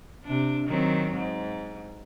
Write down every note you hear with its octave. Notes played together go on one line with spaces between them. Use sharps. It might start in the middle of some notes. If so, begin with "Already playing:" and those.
C3 D4
D#3 F#3 C4
G#2